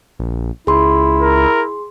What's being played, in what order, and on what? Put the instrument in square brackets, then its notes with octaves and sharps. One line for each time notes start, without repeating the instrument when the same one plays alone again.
[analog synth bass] A#1
[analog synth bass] C#2 [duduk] E4 [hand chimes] G#4 C6
[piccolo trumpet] A#4